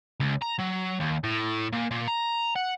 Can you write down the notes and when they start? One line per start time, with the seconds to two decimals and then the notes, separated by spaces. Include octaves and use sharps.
0.20 C#2
0.42 A#5
0.59 F#3
1.00 D#2
1.24 A2
1.73 A#2
1.91 A#2
2.08 A#5
2.56 F#5